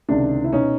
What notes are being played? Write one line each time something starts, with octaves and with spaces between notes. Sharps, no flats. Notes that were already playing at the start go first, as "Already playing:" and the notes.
C#2 C3 D#3 D4
E4
B2 C#4 D#4